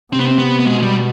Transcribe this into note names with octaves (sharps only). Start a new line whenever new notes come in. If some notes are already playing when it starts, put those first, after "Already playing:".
C3 C4
B3
C4
B3
B3
B2 G#3
G3